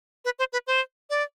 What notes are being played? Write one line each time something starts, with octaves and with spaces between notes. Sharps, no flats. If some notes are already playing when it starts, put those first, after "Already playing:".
B4
C5
B4
C5
D5